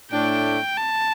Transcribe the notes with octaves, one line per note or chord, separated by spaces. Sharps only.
A2 A3 D4 G5
A5